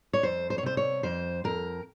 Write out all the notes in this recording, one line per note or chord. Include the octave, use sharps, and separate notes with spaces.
C#5
F2 C5
C5
C#5
C3 C5
C#5
F2 C5
F2 A#4